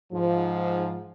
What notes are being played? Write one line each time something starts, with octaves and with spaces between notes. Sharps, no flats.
G#2 F3